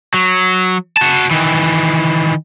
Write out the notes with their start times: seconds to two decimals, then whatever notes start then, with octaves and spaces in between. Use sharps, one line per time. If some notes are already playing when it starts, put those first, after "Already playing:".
0.14 F#3
0.97 F#4 A5
1.31 D#3 E3